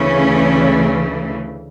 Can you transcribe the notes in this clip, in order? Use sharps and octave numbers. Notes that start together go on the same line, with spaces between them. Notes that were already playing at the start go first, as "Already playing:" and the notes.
Already playing: D2 C#3 E3 A3 C#4